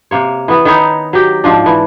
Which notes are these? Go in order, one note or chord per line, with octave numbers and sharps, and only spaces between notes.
C3 A#3 C#5
E3 B3
D#3 D#4 B4 C#5
F#3 G4
G#2 F3 D4
E3